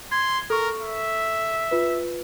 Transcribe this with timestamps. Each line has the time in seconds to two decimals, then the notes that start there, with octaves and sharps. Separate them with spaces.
0.12 C6 G#6
0.50 A4 A#4 C#6
0.82 E5
1.71 F4 B4